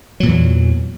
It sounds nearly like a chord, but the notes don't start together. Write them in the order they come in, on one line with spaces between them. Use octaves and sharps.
F#3 A#2 E3 E2